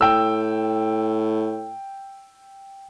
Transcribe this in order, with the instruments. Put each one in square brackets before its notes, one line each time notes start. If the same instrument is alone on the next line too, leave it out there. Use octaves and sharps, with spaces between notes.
[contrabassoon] A2 [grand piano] G5 E6